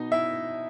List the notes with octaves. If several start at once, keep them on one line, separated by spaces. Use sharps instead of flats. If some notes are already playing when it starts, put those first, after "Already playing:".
Already playing: B2 D#4 D#5
E4 E5